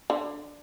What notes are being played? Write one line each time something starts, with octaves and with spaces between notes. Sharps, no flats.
D3